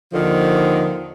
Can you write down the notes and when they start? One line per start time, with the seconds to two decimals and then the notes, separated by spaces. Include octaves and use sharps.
0.13 D#2 D3 D#3 F3